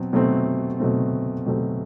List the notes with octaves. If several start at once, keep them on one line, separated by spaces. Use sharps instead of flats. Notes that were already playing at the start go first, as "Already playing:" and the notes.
Already playing: B2 F#3 C4
B2 F#3 A3 C4
B2 F#3 A3 C4
B2 F#3 A3 C4